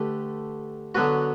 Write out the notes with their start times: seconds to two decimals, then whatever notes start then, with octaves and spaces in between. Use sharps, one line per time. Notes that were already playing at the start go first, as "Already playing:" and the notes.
Already playing: D3 A3 G4 B4
0.95 D3 F#3 B3 F#4 B4